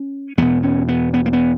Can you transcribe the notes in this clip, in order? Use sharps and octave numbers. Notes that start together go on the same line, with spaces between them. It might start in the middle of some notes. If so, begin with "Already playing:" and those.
Already playing: C#4
E2 B2 B3
C#4
B3
B3
A#3
B3